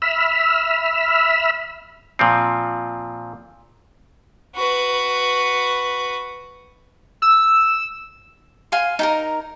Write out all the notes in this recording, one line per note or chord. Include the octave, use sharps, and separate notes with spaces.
E5 B5 E6 F6
A#2 F3 C4
F#4 B4
E6
F5 G#5 C6
D#4 G#4 A#4